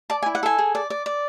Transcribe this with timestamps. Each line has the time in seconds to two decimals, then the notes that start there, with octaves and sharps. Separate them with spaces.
0.10 D5 A5
0.22 G#5
0.26 E4
0.35 F#5
0.43 A4 G#5
0.58 G#4
0.75 D5
0.90 D5
1.06 D5